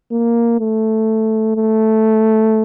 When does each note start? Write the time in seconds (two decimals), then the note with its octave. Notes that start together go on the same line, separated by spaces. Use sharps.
0.12 A#3
0.60 A3
1.56 A3